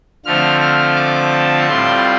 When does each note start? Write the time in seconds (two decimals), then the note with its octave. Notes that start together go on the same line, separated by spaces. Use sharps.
0.25 D3 F3 A3 C4 F6
0.61 F6
0.96 D6
1.33 A5
1.68 A2 G3 C4 F4 C6